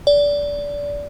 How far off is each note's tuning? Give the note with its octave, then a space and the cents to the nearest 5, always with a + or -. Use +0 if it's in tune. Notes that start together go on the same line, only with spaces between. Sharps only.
D5 -20